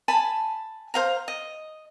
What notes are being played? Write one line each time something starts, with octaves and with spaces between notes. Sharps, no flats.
G#5 A5 B5
C5 F5 A#5
D#5